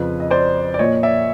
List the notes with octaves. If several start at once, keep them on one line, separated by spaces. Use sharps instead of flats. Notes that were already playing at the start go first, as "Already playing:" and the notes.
Already playing: F2 C#3 F3 B4
D#5
C5 D5
D5
A#2 F3 C#5 D#5
D5 E5